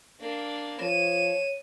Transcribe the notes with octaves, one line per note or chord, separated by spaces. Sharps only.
A#3 D4
F3 C#5 D#7 E7